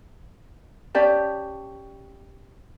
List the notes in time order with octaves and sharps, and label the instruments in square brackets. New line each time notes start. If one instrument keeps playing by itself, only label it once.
[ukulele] C#4 G4 D5 A5